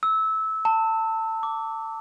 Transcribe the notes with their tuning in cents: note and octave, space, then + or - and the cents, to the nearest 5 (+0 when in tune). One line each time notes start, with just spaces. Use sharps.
E6 -20
A5 +25
D6 -20